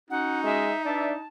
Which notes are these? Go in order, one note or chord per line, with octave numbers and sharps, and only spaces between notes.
C#4 D#4 F#4 F#5
G#3 E5
D4 B4 D5 E5 A5